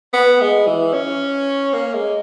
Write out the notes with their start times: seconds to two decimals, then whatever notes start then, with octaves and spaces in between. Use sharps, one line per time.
0.13 B3
0.41 G#3
0.67 E3
0.93 C#4
1.73 A#3
1.94 G#3